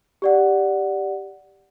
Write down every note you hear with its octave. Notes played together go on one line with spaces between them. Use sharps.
G4 D5 F#5